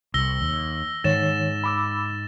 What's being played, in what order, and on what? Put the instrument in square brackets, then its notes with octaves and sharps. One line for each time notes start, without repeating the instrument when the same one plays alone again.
[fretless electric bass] C2 [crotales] E6 A#6 G7
[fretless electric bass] D#2
[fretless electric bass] G#2 [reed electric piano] D#3 C#5 [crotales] A6 E7
[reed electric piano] B5 D6 E6